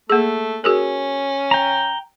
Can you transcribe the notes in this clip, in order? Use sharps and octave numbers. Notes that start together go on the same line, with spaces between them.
A3 A#3 G#4
C#4 F#4 G#4 A#4
G5 A#5